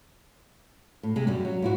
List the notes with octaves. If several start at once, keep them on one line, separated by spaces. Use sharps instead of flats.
A2
C3 G#3
F#2 F#3 G3
F#3
G#2 E4 F#4